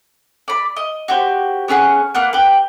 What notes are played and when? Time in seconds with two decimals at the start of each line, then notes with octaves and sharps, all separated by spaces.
0.48 D5 B5
0.77 D#5
1.08 F#4 G4 C5
1.68 B3 C#4 G#4 F#5
2.15 A#3 B3 F#5
2.33 G4 B4